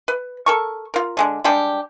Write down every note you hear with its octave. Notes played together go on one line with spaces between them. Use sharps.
B4
A4 A#4 C#6
F4 A#4
D3 G#3 D4
G3 G#3 D4 G4